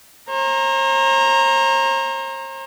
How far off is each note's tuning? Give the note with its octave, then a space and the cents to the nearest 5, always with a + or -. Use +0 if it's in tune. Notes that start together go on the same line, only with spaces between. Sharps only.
C5 +45 A#5 +0